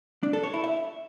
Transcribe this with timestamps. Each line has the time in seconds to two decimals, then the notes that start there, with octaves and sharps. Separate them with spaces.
0.23 D4
0.33 A4
0.43 C#5
0.54 E4
0.64 E5